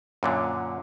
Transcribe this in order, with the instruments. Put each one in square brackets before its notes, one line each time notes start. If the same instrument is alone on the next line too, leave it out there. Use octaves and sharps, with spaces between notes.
[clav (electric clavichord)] F#2 A#2 D3